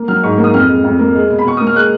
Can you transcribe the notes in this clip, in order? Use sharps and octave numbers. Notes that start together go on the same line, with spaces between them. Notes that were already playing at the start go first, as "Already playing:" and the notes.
Already playing: A#3
F#3 F6
G#2 C#6
A#3
D#6
F2 F6
G#3
F2
A#3
G#3
B2
B5
B2 C#6
A#3 D#6
F6
G#3 F#6